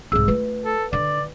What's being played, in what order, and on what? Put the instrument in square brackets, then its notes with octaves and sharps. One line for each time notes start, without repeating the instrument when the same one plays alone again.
[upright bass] C2 G#2 [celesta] G#4 E6
[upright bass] A3 F4 [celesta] B4
[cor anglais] A4
[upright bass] D3 [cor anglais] D5